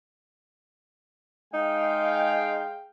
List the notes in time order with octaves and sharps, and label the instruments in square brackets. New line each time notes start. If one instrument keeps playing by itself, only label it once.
[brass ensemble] G#3 F5 G5 [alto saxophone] D#4